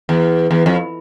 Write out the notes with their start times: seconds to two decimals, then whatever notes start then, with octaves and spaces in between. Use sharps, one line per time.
0.09 E2
0.51 E2
0.66 F2